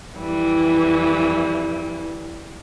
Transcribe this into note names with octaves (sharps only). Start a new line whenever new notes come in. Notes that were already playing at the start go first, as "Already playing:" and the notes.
F2 E3 G3